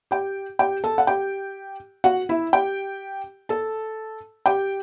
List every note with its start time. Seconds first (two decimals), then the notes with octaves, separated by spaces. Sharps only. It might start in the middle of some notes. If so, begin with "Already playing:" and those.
0.11 G4 G5
0.59 G4 G5
0.84 A4 A5
0.98 F#5
1.07 G4 G5
2.04 F#4 F#5
2.29 E4 E5
2.53 G4 G5
3.49 A4 A5
4.46 G4 G5